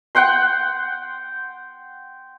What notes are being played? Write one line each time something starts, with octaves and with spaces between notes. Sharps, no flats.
F#5 G5 C6